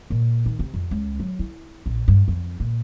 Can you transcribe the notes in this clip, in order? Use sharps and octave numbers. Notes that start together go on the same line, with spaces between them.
A#2
D#3
C3
F2
C#2
F#3
E4
A#1
G2
F2
A#2